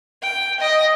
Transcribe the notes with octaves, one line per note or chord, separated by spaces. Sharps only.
G5
D#5